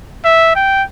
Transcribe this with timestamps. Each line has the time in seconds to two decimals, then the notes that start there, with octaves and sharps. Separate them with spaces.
0.25 E5
0.56 G5